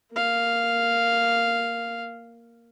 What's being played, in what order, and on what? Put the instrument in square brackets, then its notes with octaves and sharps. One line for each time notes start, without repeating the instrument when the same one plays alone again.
[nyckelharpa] A#3 F5